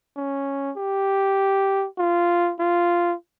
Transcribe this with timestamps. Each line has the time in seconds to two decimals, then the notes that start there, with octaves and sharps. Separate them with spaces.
0.17 C#4
0.77 G4
1.99 F4
2.60 F4